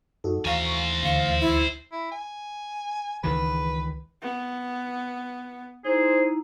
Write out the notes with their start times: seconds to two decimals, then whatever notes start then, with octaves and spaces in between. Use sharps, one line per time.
0.24 F#2 D#4 F#4 A4
0.45 D#2 E3 C5 F5 G#5 A#5 C#6
1.03 D2 F5 A6 C#7
1.40 E4
1.92 E4
2.12 G#5
3.24 C#2 D#3 E3 B4
4.22 B3
5.85 D#4 E4 G#4 C5 A#5